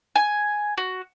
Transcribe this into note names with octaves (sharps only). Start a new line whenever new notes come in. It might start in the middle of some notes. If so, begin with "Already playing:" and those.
G#5
F#4